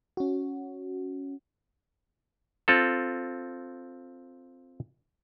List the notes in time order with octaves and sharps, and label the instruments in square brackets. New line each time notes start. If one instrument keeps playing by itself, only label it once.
[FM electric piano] C#4 F#4
[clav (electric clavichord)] C4 F4 A4